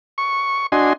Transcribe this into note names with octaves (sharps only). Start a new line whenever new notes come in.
C#6
D4 F#4 D#5 G#5 C6